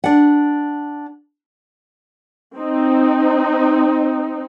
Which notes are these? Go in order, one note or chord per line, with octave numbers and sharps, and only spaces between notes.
D4 F#5
C4 D#4